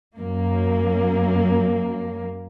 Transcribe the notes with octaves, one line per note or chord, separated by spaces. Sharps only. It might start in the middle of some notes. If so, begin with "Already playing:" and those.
F#2 A#3